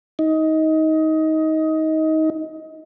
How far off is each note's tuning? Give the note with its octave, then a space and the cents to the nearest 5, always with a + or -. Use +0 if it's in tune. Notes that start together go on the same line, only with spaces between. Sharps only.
D#4 +20